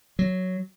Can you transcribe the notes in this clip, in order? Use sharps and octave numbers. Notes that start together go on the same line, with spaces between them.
F#3